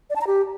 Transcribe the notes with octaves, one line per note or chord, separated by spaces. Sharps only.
D5
A5
A#5
G4